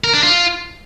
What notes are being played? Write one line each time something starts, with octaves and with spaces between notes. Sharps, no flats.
A#4
D4
F4